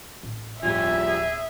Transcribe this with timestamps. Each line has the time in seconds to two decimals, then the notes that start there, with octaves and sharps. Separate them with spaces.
0.23 A1
0.63 D1 G1 F3 G3 G4 E5 G#5
1.07 G#4